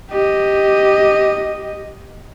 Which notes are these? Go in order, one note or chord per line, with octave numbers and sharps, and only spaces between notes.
G4 D#5